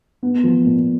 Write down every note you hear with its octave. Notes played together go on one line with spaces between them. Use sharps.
B3
F3
A#2